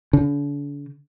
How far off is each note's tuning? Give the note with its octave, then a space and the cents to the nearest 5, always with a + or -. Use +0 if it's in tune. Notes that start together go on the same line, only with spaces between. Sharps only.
D3 -40